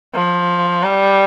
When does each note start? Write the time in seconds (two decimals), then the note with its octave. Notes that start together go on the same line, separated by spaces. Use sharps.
0.15 F3
0.83 G3